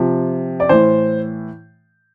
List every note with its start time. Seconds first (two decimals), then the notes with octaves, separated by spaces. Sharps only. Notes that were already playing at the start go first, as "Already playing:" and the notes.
Already playing: C3 F3
0.60 D5
0.69 A2 E3 C5